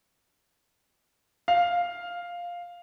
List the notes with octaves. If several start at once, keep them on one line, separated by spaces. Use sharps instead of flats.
F5